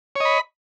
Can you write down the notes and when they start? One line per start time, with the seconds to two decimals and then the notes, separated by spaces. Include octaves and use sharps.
0.16 C#5
0.20 D#5
0.25 B5